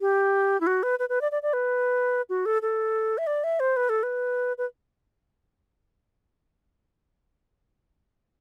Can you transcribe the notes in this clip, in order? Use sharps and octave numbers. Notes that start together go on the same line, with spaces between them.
G4
E4
F#4
B4
B4
B4
D5
D5
D5
B4
F#4
A4
A4
E5
D5
E5
C5
B4
A4
B4
B4